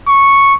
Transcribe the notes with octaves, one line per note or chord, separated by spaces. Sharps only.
C#6